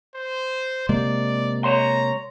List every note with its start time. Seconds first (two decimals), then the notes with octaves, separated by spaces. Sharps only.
0.16 C5
0.89 C3 G#3 A#3 D5
1.64 C#5 A#5 C6